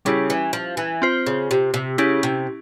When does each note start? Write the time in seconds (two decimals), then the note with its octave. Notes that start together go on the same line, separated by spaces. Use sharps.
0.05 C#3 G3 C#4 E4 G4
0.30 E3
0.53 F3
0.77 E3
1.02 C4 F4 C5
1.27 C#3
1.51 C3
1.74 C3
1.98 C#3 C#4 E4 G4
2.23 C3